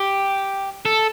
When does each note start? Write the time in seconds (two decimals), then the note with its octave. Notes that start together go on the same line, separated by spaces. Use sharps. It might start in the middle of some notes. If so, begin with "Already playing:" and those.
Already playing: G4
0.85 A4